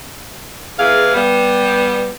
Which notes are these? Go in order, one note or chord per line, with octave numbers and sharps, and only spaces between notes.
E2 E3 G#4 F5
G3 B3